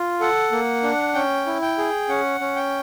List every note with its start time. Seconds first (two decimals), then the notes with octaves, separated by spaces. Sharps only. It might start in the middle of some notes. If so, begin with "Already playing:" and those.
Already playing: F4
0.20 A4 F#5
0.52 A#3
0.83 D4
1.14 C#4 G5
1.47 E4
1.62 G5
1.78 G#4
2.09 C#4 F#5
2.40 C#4
2.56 G5